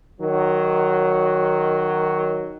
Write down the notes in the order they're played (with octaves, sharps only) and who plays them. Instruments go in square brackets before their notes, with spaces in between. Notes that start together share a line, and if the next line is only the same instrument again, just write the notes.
[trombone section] D#3 F#3